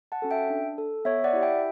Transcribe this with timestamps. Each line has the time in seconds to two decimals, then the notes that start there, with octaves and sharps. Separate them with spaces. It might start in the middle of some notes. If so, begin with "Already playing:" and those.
0.12 F#5 A5
0.22 C#4 F#4 A4
0.31 E5 G5
0.50 D4
0.78 A4
1.05 B3 C#5 E5
1.24 D5 F#5
1.33 E4 G4
1.43 E5 G5